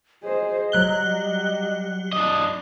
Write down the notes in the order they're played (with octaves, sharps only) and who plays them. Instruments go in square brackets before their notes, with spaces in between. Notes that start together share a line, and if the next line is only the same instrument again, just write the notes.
[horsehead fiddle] G#4 C5 [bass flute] D#5
[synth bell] F#3 F#6 G7 [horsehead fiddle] G3
[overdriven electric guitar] D4 D#5